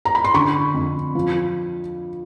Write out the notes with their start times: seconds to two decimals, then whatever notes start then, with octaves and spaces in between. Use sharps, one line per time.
0.05 A#5
0.15 B5
0.24 C6
0.34 D3 B5 C#6
0.74 F2
1.15 F3